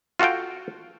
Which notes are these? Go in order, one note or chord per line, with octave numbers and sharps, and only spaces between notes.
F4 F#4 A4 F5 G5